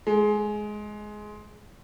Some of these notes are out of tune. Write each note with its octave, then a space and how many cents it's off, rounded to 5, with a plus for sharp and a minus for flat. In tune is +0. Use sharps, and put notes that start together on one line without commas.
G#3 +15